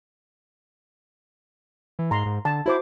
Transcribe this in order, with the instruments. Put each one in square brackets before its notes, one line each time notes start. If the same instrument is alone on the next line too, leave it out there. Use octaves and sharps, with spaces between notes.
[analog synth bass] E3
[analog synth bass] G#2 [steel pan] A#5 C6
[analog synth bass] G#2
[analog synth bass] D3 [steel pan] A5
[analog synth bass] E4 [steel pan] F#4 C5 D6